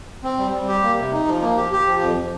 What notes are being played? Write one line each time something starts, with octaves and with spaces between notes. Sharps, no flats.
C4
G3
G3
G4
A#3
C3
D#4
F3
A#3
G4
G4
F3
F2